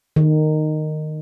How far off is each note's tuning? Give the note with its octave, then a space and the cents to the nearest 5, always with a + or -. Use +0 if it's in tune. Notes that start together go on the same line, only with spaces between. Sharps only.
D#3 -15